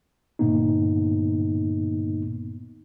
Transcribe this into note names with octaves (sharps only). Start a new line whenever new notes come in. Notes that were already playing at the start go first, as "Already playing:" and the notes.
G2 A#2 D3 A#3 B3 D#4